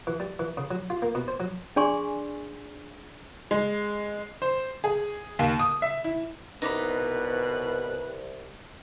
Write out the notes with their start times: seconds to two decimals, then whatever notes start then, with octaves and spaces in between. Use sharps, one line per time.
0.07 E3
0.20 G3
0.39 E3
0.57 C#3
0.71 F#3
0.90 F4
1.02 A#3
1.15 B2
1.28 C5
1.40 F#3
1.76 D4 G#4 D5 G#5 C6 C#6
3.51 G#3
4.42 C5
4.84 G#4
5.39 D#2
5.60 D#6
5.82 E5
6.04 E4
6.62 C2 B2 D#4 B4 D5 B5